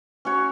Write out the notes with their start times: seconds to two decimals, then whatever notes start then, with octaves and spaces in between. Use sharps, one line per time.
0.25 C#4 F#4 C#5